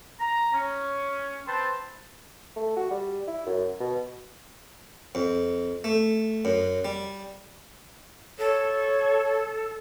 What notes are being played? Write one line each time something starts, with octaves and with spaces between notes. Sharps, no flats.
A#5
C#4
C4 B4 C5 A5
A3
F#4
G3
E4
F#2
B2
F2
A3
F#2
G3
A4 C#5